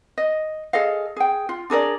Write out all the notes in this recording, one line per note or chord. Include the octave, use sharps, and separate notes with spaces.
D#5
G#4 A4 D#5 F5
G#4 G5
F4
D4 G#4 A#4 D5